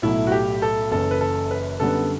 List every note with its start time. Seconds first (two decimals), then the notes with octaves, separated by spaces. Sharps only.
0.02 B1 A2 F#3 A3 E4
0.27 F#4
0.32 G4
0.62 A4
0.92 F#1 F#2 E3 A4
1.11 B4
1.21 A4
1.51 B4
1.80 F#2 D3 G3 B3 A4